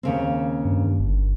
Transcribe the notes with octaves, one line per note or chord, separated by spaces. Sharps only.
D#2 C#3 C4
G2
G1